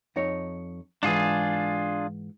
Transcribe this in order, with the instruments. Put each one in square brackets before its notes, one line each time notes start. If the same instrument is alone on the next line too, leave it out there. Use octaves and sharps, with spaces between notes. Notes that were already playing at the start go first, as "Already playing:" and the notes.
[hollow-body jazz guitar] F2 D#4 C#5
[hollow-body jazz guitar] G#2 E3 [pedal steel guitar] D4 F4 G#4